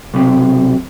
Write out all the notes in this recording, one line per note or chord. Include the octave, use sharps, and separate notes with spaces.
B1 C3